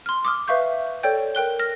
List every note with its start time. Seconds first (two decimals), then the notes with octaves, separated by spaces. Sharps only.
0.06 C6 F6
0.25 D6 D#6 F6
0.48 B4 E5 F5 C#6 G6
1.03 A4 C#5 D5 G5 G6
1.35 A#4 G5 F#6 G7
1.59 F6 A#6